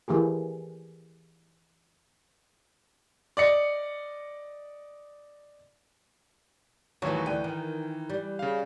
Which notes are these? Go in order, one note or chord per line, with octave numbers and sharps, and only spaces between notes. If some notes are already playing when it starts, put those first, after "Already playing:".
E3 A#3 G4 G#4
D5 D#5 C#7
D#2 A2 E3 F#3
D2 E3 G5 D#7
D#3
G3
C#3 F5